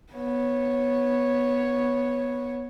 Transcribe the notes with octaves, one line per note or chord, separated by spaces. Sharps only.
B3 C#5